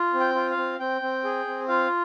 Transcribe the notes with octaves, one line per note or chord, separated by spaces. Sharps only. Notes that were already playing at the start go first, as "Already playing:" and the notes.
Already playing: F4
C4
G5
F4
F5
C4
C4 G5
C4
G#4
C4
F4 F5